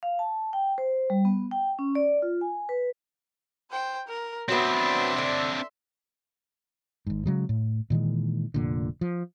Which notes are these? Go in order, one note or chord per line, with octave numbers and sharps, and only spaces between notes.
F5
A5
G5
C5
G3
B3
G5
C#4
D5
F4
G#5
B4
C5 G5
A#4
F#3 B3 C4 D4 E5 C6
D3
G#1 G#2
C#3 F#3 G#3
A2
A#2 D#3 E3 G#3
F1 A#2 D3
F3